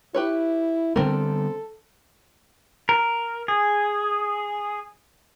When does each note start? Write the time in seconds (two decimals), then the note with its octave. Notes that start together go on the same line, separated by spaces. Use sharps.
0.14 E4 G4 B4 C#5
0.96 D3 G3 B3 C4 A4 A#4
2.89 A#4
3.48 G#4